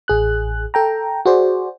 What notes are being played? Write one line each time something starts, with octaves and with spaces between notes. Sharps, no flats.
A1 G#4 F#6
A4 G5 A#5
F#4 G#4 C5 D5